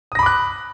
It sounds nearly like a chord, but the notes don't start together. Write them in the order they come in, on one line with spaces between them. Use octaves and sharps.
D#6 A#6 B5 D6 F#6